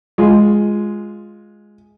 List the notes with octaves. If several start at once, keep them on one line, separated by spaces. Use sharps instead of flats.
G#3 F4